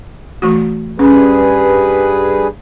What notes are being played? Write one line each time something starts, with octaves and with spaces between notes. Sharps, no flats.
E3 A3 F#4
G2 C#4 G#4 B4